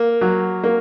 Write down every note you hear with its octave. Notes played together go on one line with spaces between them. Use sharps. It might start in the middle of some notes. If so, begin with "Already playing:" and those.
Already playing: A#3
F#3
A#3